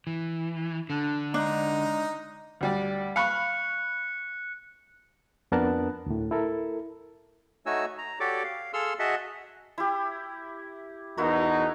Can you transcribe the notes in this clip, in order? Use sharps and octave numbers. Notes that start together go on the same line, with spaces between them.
E3
D3 D4
G#3 D4 D#4 A#5
D2 G3 D5
F5 B5 C#6 F#6 C#7
F2 B3 D4 A#4 A5 F#6
D2 A2
E4 A4 A#4
A3 D#4 F#4 C#5 G#5 E6
A#5
F#4 G4 A4 C#5 D5 D6
F5
G#4 A4 F5 C6 E6 F6
F#4 G#4 D#5 E5 F#5 A5
E4 G4
E2 B2 D#4 E4 F#4 A#4